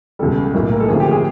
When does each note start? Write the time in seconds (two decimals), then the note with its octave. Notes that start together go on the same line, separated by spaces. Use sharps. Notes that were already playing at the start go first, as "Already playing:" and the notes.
0.19 C#2 B2 G3 A4
0.54 B1 A2 F#3 A#3
0.71 A#4
0.80 A4
0.88 D2 C3 F3 A#3 G#4
1.00 G4
1.11 G#4